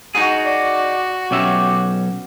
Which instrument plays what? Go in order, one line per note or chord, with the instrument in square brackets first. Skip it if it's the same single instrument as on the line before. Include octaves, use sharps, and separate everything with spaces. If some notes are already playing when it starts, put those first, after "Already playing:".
[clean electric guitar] D#4 G#4 [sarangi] F#4
[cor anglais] D5
[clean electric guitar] B1 C#4 E5 [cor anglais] G4